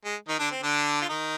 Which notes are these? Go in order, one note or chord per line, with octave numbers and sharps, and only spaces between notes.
G#3
D#3 D#4
D3 D4
C4
D3 D4
F4
D#3 D#4